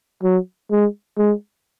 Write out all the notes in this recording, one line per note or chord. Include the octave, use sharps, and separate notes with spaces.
F#3
G#3
G#3